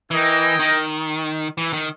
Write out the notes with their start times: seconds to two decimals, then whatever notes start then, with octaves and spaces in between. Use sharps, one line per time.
0.11 E3 E4 A#4 D#5 G5
0.59 D#3
1.58 E3
1.73 D#3